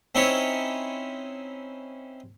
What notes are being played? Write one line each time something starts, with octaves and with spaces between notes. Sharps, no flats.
C4 C#4 D#4 E4 C#5